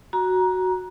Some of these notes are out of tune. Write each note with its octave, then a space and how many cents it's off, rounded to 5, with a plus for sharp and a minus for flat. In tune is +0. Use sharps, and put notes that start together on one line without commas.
F#4 +0 A#5 +20